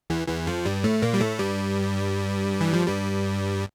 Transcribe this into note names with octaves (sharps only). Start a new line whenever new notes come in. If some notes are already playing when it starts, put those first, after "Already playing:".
E2 E3
E2 E3
F2 F3
G2 G3
A2 A3
A#2 A#3
G3
A2 A3
G2 G3
E3
F3
G2 G3